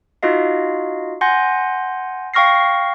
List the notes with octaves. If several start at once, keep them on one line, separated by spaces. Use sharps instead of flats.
D#4 F4 F#4 D#5 F5
F#5 G#5 C6 G6 A#6
F5 G5 C#6 F6 A#6 C7